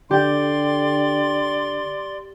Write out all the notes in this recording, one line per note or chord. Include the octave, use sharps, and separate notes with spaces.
D3 G4 D5 G5 C6